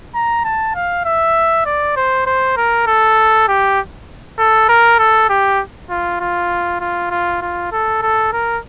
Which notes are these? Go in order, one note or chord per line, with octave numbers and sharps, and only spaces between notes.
A#5
A5
F5
E5
D5
C5
C5
A#4
A4
G4
A4
A#4
A4
G4
F4
F4
F4
F4
F4
A4
A4
A#4